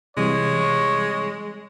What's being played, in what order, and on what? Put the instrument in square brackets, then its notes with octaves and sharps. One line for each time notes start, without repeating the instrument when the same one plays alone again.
[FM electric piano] C3 E3 G3 [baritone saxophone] G#3 [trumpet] C#5